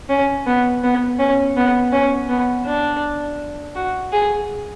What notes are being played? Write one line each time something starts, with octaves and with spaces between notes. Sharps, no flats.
C#4
B3
B3
C#4
B3
C#4
B3
D4
F#4
G#4